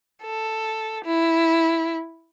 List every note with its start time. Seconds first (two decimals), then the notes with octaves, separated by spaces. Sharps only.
0.23 A4
1.04 E4